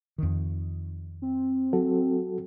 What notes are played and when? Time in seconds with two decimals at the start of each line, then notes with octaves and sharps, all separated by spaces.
0.18 F2 D#3
1.22 C4
1.73 F#3 F#4 A4